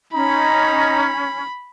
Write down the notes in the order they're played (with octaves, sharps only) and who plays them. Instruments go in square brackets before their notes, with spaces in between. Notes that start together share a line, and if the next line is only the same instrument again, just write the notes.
[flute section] C#4 [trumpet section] D#4 A#5 [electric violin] B5